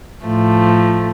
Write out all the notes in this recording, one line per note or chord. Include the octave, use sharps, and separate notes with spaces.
A2 F3 A3